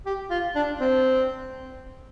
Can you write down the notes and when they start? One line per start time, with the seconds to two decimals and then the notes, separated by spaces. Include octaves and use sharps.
0.06 G4
0.31 F4
0.55 D4
0.80 C4